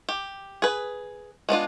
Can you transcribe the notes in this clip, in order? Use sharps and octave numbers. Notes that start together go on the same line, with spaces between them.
G4
G#4 B4
G#3 B3 D4 F4